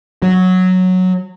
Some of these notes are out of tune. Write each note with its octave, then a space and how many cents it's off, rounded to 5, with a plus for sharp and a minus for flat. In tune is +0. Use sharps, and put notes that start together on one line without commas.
F#3 -5